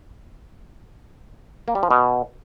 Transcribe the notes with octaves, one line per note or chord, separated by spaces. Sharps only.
A#3
G3
F3
B2